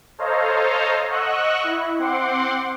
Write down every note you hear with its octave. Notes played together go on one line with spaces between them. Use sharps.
A4 C5 C#5 D#5 F5 A#5
D#5 F#5 C#6 E6 F#6
E4
C4 F#5 C6 D6